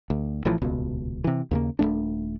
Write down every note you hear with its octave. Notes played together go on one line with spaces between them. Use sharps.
D2
A1 A2 E3 F3
D#1 C#2 B2
C3 E3
D#2 C#3 A#3
D#1 E2 A3 D4